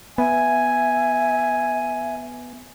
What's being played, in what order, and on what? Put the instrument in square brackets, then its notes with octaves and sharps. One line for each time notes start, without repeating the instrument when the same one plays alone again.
[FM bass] B3 [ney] E5 [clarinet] G#5